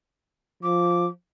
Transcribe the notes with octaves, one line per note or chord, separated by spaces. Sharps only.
F3 D6